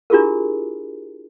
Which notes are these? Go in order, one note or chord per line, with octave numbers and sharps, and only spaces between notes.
D4 E4 F4 G4 G#4 A#4